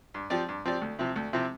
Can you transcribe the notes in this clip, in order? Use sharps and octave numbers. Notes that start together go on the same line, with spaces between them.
G2
F3 C4 G4 D5
G2
F3 C4 G4 D5
D2
C3 F3 C4 E4
D2
C3 F3 C4 E4